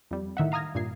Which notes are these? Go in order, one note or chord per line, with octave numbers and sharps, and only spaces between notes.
F2 G3
A2 D#3 E5 F#5
F5 A#5 D#6 F6 G#6 A#6
G2 A#2 G#6 C7